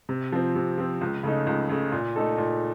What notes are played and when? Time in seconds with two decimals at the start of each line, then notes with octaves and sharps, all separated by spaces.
0.09 C3
0.32 F3 C4
0.55 C3
0.78 F3 C4
1.01 C#2
1.23 C#3 A3 D#4
1.47 C#2
1.69 C#3 A3 D#4
1.92 A#2
2.16 A3 D#4 A4
2.38 A#2